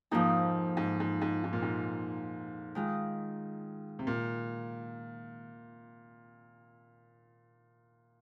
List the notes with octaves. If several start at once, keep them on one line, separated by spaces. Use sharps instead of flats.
F2 G#2 F3 A#3 D#4
G#2
G#2
G#2
G#2
A#2
G#2
D#3 G#3 F4
C3
A#2